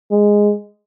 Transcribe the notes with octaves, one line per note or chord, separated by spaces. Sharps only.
G#3